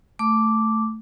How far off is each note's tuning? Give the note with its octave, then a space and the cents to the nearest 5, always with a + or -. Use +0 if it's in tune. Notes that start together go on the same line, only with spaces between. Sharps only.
A3 +0 D6 -5